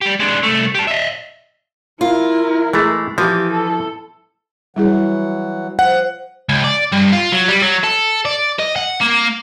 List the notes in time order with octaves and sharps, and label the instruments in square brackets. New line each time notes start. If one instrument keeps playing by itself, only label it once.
[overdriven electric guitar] G3 G4
G#3 D4
C2 A3
G4 A5
D#5 E5
[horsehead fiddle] E4 A#4 [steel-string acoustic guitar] F4
[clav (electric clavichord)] E3 A3 [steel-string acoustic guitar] G#3
[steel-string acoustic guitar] E3 [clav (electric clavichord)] F3 [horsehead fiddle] G4
[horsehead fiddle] A4
[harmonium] E3 F#3 F#5 [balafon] G3 E4 G#4
[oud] F3 [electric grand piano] F#5
[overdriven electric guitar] C#2
D5
G2
F4
F#3
G3
F#3
A4
D5
D#5
F#5
A#3